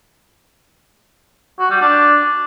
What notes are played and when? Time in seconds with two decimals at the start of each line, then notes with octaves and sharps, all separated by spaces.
1.59 F#4
1.70 G3
1.81 D4